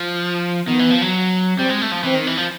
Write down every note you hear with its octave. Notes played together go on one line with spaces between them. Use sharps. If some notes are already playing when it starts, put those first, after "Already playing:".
Already playing: F3
D#3 B3
E3
F3
F#3
G3 C4
G#3
A3
F3
E3 C4
D#3
E3
F3